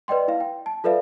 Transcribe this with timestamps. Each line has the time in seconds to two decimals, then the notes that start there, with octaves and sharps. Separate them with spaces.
0.08 B4 D5 D#5 G5 C6
0.28 E4 F5
0.41 G5
0.66 A5
0.84 F4 A4 B4 D5 E5 F5